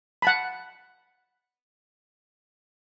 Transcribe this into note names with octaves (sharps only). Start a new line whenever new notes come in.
F#5 A5 B5